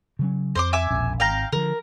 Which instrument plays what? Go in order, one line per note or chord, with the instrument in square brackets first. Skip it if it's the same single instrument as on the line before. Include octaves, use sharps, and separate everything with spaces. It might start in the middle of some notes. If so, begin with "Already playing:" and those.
[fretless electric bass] C#3 F#3 C#4
[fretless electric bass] F2 [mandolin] C5 C6 D6
[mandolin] E5 G#5 D6
[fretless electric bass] E1 A#1 C#4
[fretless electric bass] G#1 [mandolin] F5 G5 A#5
[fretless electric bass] D3 F3 [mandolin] A#4